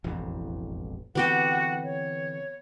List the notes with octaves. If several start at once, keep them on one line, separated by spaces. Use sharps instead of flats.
E1 A1 F2
D3 E3 B3 C4 F#4 G4 F#5 G5
C#5